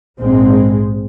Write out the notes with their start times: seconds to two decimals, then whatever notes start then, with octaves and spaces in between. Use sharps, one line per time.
0.20 A#1 G#2 G#3 C4